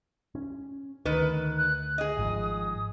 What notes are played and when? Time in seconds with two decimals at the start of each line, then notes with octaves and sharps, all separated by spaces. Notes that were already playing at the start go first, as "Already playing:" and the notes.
0.35 C#4
1.05 D2 D#3 B4
1.58 F#6
1.98 G#4 D#5 D#6
2.17 G#1 G#2 F3